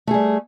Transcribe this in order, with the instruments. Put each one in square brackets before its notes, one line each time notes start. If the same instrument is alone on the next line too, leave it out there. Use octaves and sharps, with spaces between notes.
[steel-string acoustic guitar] A3
G#4
G3